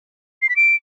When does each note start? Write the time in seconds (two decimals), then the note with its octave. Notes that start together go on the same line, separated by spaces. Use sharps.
0.42 C7
0.49 B6
0.56 D7